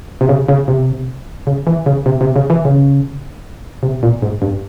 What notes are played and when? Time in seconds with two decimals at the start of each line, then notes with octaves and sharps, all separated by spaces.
0.21 C3
0.29 C#3
0.49 C#3
0.68 C3
1.47 C#3
1.67 E3
1.86 C#3
2.06 C3
2.21 C3
2.36 C#3
2.50 E3
2.65 C#3
3.83 C3
4.03 A#2
4.22 G#2
4.42 G2